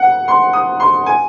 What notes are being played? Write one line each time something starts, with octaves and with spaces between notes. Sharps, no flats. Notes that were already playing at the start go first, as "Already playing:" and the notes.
Already playing: F#5
C6
D#6
C6
G#5